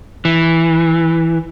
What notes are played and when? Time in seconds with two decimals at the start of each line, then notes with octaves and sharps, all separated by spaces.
0.25 E3